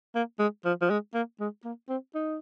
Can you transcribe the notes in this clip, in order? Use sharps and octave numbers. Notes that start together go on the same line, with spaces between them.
A#3
G#3
F3
F3
G#3
A#3
G#3
A#3
C4
D#4